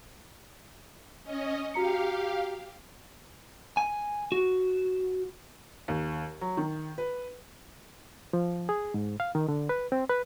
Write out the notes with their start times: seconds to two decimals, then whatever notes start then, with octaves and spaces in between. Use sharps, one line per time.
1.24 C#4 D#5
1.74 F#4 G4 F5 A#5 C#7
3.77 G#5
4.32 F#4
5.88 D#2
6.41 F#3
6.57 D#3
6.98 B4
8.33 F3
8.69 G#4
8.94 G#2
9.20 F5
9.35 D#3
9.49 D3
9.69 B4
9.92 C4
10.10 B4